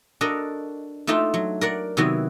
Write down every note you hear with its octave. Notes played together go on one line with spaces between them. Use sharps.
D4 F#4 A4 A#4 D#5
A3 D4 D#4 F4 E5 G5
F#3
A#4 D5 F#5
C3 D#3 F#3 B3 E4 F#4